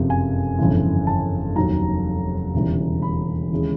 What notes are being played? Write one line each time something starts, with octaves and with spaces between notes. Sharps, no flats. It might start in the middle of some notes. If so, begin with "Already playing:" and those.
Already playing: F#1 F2 C3 F3
G#5
G1 F2 C#3 E3
A5
F1 D#2 D#3 F#3 A#5
E1 D#2 C#3 E3 G3
B5
D#2 C#3 E3 G#3 C#4